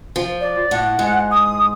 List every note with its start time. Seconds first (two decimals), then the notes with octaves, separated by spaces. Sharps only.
0.16 F3
0.41 D5
0.71 A2 F#5
0.99 G#2
1.31 D#6